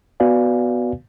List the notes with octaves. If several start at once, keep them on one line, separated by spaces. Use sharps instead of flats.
B3 F#4 B4 D5 F5 G#5